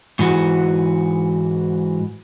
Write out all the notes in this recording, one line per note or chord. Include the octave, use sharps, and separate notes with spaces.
G#2 E3 F#4